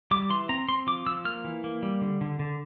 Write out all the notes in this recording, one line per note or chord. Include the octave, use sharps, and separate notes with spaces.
G3 D6
E3 C6
C4 A#5
C4 C6
F3 D6
F3 E6
A#3 F6
E3
A#3
G3
D3
D3
D3